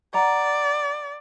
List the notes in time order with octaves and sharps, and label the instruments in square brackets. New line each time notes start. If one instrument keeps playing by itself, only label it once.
[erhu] D5 [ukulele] F#5 A#5